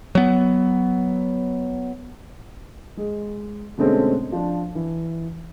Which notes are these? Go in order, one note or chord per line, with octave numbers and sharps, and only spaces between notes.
F#3 B3
G#3
B2 D3 G#3 A3 C4 C#4
F3 D4
E3